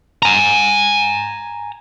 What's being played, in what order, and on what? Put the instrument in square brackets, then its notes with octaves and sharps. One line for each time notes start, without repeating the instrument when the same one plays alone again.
[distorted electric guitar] G#5 A#5